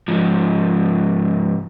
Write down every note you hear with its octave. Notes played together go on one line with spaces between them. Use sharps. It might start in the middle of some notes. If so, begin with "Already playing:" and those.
G#2 F3